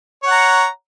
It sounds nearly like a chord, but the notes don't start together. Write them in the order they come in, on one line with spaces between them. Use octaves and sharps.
C#5 F#5 A#5